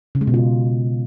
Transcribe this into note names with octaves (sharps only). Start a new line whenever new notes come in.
C#3
G#3
B2
F4